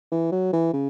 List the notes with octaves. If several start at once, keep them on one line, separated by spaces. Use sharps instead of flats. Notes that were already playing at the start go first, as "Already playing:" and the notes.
E3
F#3
E3
C#3